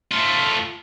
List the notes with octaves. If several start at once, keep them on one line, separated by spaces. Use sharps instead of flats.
A3 F4